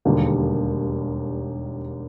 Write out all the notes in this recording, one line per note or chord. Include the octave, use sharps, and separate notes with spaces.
E1 D#2 D3 G3 A#3